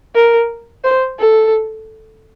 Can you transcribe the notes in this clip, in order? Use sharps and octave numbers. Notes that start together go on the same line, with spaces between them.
A#4
C5
A4